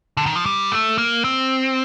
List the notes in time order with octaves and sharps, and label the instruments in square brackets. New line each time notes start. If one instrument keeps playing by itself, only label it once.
[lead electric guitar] D3
D#3
F3
G3
A3
A#3
C4